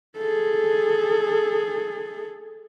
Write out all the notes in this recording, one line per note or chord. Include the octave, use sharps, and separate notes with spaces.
G#4 A4